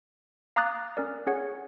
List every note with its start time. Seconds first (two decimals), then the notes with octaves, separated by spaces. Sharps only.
0.56 F5 A#5 D6 D#6 F#6 A6
0.97 C#4 A#4 D5
1.27 C#4 G#4 C#5 F#5